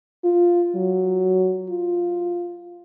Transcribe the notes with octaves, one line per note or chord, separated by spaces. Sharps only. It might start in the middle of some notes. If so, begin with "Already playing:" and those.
F4
F#3
F4